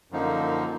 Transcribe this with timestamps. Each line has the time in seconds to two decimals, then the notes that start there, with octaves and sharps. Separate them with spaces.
0.11 F#2 D3 F3 A#3 D#4